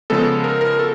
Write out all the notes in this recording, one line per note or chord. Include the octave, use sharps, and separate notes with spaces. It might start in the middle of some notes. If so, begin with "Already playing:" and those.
C#3 F3 G#3 B3 A4
A#4
A#4
A4